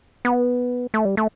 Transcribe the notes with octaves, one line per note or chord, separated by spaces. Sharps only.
B3
A3
G3
A3